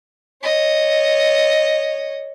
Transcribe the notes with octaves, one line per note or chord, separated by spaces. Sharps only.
C#5 D#5